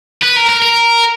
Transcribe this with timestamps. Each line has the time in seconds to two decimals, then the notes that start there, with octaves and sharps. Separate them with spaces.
0.22 B4
0.36 A#4
0.49 A#4
0.62 A#4